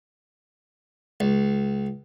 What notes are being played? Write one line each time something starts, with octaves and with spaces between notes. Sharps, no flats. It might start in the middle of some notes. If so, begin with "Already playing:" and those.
C#2